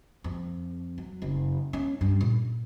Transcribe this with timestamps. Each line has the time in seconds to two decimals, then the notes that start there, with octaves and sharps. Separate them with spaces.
0.24 F2
0.98 F#3
1.22 F#1
1.73 C#4
2.01 G2
2.21 A#2